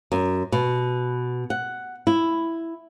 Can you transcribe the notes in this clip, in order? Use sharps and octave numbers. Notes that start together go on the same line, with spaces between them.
F#2
B2
F#5
E4